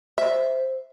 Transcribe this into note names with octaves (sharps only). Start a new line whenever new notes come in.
C5 E5